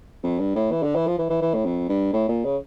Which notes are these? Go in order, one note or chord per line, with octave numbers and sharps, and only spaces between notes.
F2
G2
A2
E3
D3
E3
F3
E3
E3
E3
A2
F2
G2
A2
A#2
C#3